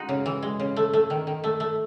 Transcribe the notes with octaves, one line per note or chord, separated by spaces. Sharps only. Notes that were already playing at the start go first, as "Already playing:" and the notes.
Already playing: G#3 D#4 F#4
C#3
E3
G#3
C#3
A3
A3
D#3
D#3
A3
A3